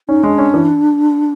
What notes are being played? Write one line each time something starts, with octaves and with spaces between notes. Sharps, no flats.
C#4 D#4
G#3 D4
C#4
E3